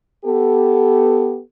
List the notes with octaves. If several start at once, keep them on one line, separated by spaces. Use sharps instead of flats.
B3 G4 A4